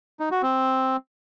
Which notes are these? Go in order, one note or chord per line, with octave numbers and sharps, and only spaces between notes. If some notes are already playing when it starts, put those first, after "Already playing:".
D#4
F#4
C4